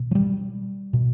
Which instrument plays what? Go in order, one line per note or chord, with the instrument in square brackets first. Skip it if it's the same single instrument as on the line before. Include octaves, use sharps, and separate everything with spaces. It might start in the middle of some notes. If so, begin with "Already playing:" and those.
Already playing: [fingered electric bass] B2
F#3
G3
B2